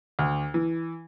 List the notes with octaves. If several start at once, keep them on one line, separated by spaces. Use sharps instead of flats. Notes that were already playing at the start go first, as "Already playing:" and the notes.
D2
E3